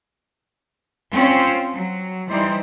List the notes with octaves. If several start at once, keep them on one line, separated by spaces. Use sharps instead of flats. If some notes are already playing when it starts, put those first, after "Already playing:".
C4 C#4 F4 C5 C#5
F#3
E3 G3 D#4 C5 D5